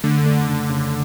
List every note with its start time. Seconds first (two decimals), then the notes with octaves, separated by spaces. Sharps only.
0.04 D3 A3
0.26 A3
0.48 C#3
0.70 C#3